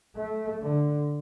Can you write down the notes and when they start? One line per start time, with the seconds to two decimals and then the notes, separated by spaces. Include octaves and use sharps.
0.16 A3
0.61 D3